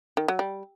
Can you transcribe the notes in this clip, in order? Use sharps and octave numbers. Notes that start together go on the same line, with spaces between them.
D#3
F#3
G3